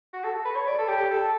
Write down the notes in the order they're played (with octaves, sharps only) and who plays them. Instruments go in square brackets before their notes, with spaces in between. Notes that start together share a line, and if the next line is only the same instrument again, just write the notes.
[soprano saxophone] F#4
A4
B4
C#5
D5
A4
G4
A4